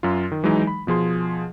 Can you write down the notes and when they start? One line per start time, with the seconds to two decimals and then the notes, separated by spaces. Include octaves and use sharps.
0.03 F#2 F#3 F4
0.32 D#3
0.44 E3 F#3 G#3 D#4
0.67 B5
0.87 B2 F3 G#4 C6